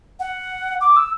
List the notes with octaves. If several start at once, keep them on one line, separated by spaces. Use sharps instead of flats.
F#5
D6
E6